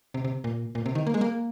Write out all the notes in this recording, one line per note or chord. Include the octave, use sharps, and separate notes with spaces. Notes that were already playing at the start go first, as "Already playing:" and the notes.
C3
C3
A#2
A#2
C3
D#3
A#3
G#3
A#3